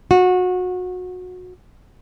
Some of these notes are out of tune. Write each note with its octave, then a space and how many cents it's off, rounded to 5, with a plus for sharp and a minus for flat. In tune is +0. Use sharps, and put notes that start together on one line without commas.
F#4 -25